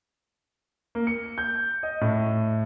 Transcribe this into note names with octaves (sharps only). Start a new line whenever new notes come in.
A#3
C#7
G6
D#5
A2